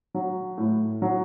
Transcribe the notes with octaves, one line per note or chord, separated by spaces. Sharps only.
F#3
A2
F#3